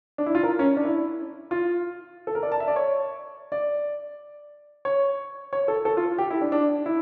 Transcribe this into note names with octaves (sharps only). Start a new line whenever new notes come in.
D4
E4
F4
A#4
C#4
D4
E4
F4
A4
A#4
D5
A5
E5
D5
C#5
D5
C#5
C#5
A4
A4
F4
G4
E4
D4
D4
E4